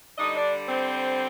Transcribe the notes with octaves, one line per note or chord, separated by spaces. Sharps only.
D3 G3 D4 D#4 D#5
D4 D5
C4 C5